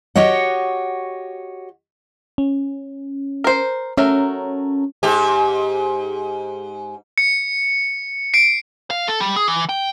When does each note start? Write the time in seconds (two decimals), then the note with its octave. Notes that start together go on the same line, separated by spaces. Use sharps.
0.16 F#4 G4 C#5 D#5 F#5
2.38 C#4
3.44 A#4 C5
3.97 F#3 A3 C#4 A#4
5.03 G#2 G4
7.18 C#7
8.34 C7 D7
8.90 F5
9.08 A4
9.20 G3
9.36 G#4
9.48 E3
9.69 G5